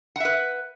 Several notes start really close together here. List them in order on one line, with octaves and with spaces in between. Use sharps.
F#5 E5 B4